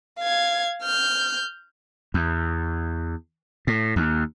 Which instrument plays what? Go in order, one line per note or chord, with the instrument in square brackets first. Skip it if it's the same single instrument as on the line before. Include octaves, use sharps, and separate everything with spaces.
[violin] F5 G#6
F6 G6
[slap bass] E2
A2
D#2